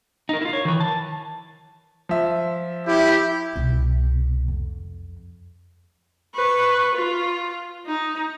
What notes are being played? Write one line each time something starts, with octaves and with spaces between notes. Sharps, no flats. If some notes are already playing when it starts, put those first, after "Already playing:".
D#4 A#4
E4 F4
C#5
D#3 E3
A5
F3 E5
E4 G4
C2 B2
F2
B4 C#6
F4
D#4